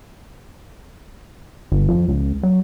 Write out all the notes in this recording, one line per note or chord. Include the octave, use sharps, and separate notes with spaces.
G1
F2
C#2
F#3